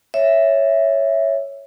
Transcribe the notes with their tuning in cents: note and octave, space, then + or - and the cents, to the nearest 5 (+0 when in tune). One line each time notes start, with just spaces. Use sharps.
C#5 +0 E5 +0